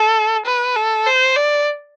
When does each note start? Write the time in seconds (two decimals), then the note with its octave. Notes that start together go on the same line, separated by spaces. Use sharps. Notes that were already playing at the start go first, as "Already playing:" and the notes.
Already playing: A4
0.46 B4
0.76 A4
1.06 C5
1.37 D5